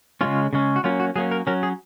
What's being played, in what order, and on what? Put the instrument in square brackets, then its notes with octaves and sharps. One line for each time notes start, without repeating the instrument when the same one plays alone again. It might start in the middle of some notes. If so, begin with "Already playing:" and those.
[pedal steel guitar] C#3 G#3 C#4 F4
C#3 G#3 C#4
F#4
F#3 A#3 C#4 F4
F#4
F#3 A#3 C#4 G#4
A#4
F#3 C#4 A#4
G#4